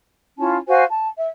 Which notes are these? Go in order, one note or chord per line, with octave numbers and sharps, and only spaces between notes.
C#4 E4 F4 A5
F#4 C5 F5 G#5
A5
E5